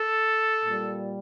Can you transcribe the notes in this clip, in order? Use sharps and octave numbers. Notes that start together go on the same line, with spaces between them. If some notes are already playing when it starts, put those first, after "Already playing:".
Already playing: A4
A#2 G3